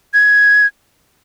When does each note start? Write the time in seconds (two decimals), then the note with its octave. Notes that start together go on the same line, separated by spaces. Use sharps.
0.14 G#6